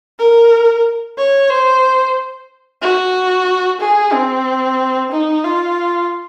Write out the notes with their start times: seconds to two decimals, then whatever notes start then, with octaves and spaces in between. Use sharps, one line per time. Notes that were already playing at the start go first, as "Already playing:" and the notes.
0.19 A#4
1.18 C#5
1.50 C5
2.82 F#4
3.81 G#4
4.13 C4
5.12 D#4
5.45 F4